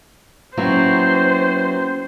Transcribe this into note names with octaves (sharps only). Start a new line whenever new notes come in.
F#3 A#3 B3 C#4 E4 C5 G5